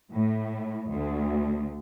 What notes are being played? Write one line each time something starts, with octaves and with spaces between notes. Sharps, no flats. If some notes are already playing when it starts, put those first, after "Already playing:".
A2
D2